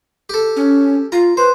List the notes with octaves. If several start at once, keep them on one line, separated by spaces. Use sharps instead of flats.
G4 A4
C#4
F4 A#5
B4 C5